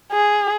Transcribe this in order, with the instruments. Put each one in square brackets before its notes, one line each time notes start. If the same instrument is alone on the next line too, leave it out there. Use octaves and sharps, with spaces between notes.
[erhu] G#4